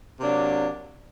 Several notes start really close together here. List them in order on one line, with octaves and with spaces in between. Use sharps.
C3 A#3 D4 F#3